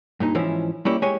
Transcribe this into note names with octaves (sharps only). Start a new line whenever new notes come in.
G2 A#2 D#4
G#2 E3 F3 C#4 E4
G3 A#3 C#4 E4 G4
G#3 G4 C#5 G#5